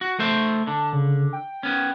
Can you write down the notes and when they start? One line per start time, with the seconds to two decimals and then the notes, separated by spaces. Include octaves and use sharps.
0.01 F#4
0.19 A3 C5 E5 G6
0.67 D3 A5
0.93 C#3
1.33 G5
1.63 B3 C#4